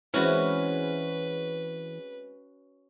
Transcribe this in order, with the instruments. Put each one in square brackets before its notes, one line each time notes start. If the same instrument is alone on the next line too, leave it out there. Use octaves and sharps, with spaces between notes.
[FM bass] E3 [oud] G#3 C4 E4 [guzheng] C#4 F#4 [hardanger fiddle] B4